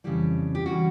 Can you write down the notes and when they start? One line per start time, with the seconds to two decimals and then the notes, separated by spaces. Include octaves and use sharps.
0.04 F2 C#3 E3 G3 G4
0.55 G4
0.66 C#3 E3 G3 F#4